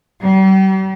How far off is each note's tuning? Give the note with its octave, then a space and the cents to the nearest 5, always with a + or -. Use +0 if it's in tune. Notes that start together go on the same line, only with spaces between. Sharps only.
G3 -40